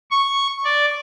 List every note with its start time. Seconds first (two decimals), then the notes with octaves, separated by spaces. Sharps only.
0.11 C#6
0.65 D5